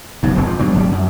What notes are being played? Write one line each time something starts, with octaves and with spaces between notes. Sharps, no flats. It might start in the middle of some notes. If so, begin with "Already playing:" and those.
F1 B1 G2
D#1 E2 G2 C4
F3
G2 B2 F#3
D1 F#2 F#3 G3
F#2